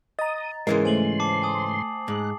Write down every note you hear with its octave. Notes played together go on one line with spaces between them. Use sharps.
D#5 A#5 D#6 A6
G#2 C#3 E3 G#3 A#4 C6
A3 C5 G#5 F#7
A5 D6 C7
G#5 D#6
G#2 F#6